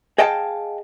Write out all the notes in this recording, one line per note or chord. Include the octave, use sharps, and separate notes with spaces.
G#4 D#5 F5 G5 A5